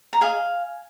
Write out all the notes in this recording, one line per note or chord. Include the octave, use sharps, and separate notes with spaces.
A#5
G#4 D#5 F5 G#5